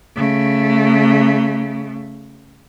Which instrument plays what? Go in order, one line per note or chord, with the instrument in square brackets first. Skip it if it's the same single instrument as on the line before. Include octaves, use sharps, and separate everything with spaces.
[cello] C#3 A3